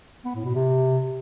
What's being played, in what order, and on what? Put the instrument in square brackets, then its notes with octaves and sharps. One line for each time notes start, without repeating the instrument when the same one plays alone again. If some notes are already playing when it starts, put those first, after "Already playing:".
[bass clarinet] B3
A2
B2
C3